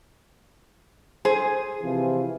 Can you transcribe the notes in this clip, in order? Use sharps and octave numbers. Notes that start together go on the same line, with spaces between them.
G#4 C5
C3 E3 F3